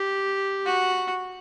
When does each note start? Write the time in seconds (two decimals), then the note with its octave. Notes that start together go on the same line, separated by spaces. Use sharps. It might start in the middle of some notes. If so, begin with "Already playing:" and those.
Already playing: G4
0.66 F#4